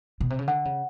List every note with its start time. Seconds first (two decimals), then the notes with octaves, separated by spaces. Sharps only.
0.20 B2
0.30 C3
0.39 C#3
0.48 D3 F#5
0.65 C#3